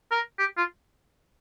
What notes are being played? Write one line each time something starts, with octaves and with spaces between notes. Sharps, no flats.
A#4
G4
F4